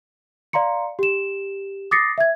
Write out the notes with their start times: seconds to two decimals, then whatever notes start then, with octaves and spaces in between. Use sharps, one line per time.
0.53 D5 F5 A#5 C6 C#7
0.99 G4 E7
1.91 D6 D#6 A6 A#6 C7 C#7
2.18 E5 G#6